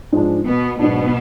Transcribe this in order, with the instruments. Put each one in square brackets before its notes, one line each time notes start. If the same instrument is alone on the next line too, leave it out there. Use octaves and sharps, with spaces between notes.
[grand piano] G#2 F3 G#3 D4
[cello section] B2 B3
[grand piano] G#2 F#3 D4 [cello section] B2 B3